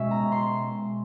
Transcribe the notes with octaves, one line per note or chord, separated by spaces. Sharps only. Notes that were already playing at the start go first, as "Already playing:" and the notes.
Already playing: B2 G#3 C#4 E5
A#5
C6